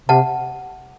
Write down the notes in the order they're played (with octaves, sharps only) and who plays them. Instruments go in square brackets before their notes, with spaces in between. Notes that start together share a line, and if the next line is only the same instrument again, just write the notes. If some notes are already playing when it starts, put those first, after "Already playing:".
[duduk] C3 [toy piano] F#5 A5